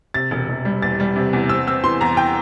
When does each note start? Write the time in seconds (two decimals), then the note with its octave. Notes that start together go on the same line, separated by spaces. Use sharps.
0.14 C3 A6
0.31 E1
0.49 E1
0.65 G3
0.82 E2 A6
1.00 G3
1.16 C3
1.33 E2
1.49 C4 E6
1.67 C4 E6
1.84 E3 C6
2.01 E2 A#5
2.17 G5